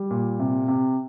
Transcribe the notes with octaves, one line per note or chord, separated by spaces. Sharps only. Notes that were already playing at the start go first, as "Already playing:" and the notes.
Already playing: G3
A#2
C3
C3